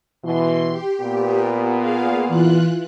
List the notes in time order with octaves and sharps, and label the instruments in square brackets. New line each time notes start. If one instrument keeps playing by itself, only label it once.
[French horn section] B2 E3 [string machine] C6
[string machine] G4
[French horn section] A#2 B3
[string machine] G#4 F5
E3 F4 F#6